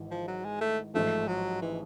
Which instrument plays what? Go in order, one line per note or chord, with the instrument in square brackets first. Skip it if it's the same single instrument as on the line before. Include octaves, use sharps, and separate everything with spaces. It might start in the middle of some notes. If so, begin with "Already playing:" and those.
Already playing: [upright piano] G#1 G#2 E3
[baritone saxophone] F3
F#3
G#3
A3
[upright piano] A1 G#2 F3 [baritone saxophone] A3
[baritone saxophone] F#3
E3